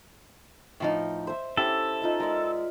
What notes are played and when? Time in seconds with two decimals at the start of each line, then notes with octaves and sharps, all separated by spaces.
0.80 A2 F3 D#4
1.27 C5 E5
1.57 C#4 E4 G4 A4 C5
2.02 D#4 F4 E5
2.20 G#3 A#4 D5